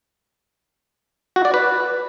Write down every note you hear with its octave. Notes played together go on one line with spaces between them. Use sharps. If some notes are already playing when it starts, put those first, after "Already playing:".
F#4
D5
B4